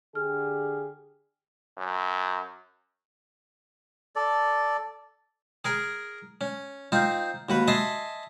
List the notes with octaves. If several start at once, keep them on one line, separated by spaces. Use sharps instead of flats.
D3 G4 G#4 F6
F#2
A4 D5
G#4 A#4 G#5
C#4
C4 D#4 F4 C5
D#2 F#4 B4
D#5 E5 G#5 A5 C6 D#6